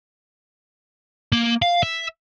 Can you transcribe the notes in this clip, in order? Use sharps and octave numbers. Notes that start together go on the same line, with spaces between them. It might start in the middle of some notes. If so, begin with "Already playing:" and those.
A#3
F5
E5